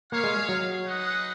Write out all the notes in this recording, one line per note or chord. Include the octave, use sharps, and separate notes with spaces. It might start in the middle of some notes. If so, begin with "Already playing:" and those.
A#3 C#4 G#4 C#5 F5
G#3
F#3
D#4 G#4 B4 D#5 F#5